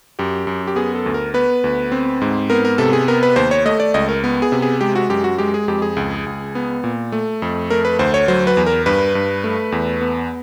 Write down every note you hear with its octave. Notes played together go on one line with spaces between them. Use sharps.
F#2 G4
F#2
G4
B3 G#4
A4
D2
A#4
B3 B4
D2
C4
G#2
B3 A#4
A#4
C3 A4
G#4
B3 A#4
B4
D#2 C5
C#5
A3 D#5
D5
C#2 D#5
A#4
B3
G#4
C3
G#4
G#3 G4
F#4
F#2 G4
F#4
G#3 G4
G#4
F2 G4
G#4
C#2
C#2
B3
A#2
A3
F2
A3 A#4
B4
D2 C5
C#5
F#3 C5
B4
E2
A#4
G2 B4
G2
A3
E2
B3